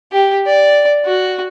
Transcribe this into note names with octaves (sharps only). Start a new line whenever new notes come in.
G4
D5
F#4